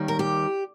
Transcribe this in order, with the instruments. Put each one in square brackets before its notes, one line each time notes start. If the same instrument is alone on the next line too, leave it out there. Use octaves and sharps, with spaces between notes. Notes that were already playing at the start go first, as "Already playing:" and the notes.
Already playing: [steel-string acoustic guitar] D#2 D#3 G3
A#4
G4